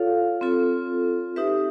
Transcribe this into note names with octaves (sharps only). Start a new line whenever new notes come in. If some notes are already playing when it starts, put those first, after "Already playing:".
Already playing: F4 A4 C#5 F5
C4 F4 A4
D#4 G4 B4 E5